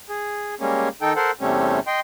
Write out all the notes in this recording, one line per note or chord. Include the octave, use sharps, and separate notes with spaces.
G#4
G3 G#3 A#3 C#4
D#3 D#4 A4 G5
A4 A#4 C5 F#5
E2 C3 G3 A3 C4 C#4
D#5 G5 C6